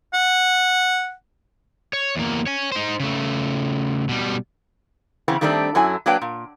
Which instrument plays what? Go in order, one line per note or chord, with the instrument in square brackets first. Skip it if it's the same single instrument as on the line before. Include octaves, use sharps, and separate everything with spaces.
[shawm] F#5
[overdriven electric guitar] C#5
E2 A#3
C#5 G#5
D#4 C5
C#3 A3
B2 G3
[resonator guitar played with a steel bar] C#3 E3 B3 C4
D#3 G3 A3 C4 D4
F#2 F#3 E4 A4 G#5
F#3 A#3 D4 B4 G5
A#2